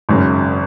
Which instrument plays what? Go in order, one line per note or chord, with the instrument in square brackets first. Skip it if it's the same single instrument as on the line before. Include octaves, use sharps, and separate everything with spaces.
[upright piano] G#1 F#2 C#3